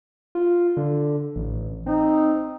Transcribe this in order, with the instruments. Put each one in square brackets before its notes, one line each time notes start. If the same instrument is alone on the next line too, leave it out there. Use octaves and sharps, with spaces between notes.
[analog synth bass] F4
D3
A1
[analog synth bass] C4 [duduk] D#4